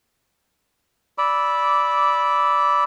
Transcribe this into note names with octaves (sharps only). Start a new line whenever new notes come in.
D5 B5 D6 E6